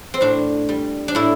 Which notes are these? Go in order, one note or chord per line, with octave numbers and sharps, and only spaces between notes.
C4
A2 D4
G3
D4
A2 E4